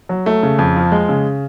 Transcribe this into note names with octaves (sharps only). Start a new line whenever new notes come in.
F#3
A3
C#3
F2
F3
G#3
C#3